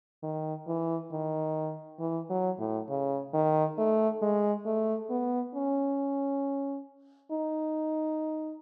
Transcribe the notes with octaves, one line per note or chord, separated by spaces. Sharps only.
D#3
E3
D#3
E3
F#3
A2
C#3
D#3
A3
G#3
A3
B3
C#4
D#4